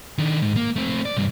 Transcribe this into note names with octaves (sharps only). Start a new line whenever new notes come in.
D#3 D4
G#2
A#3
A3 C4
D5
C2 G2